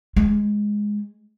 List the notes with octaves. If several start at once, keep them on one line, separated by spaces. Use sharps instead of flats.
G#3